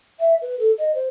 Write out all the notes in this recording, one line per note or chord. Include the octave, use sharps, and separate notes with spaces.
E5
B4
A4
D#5
C5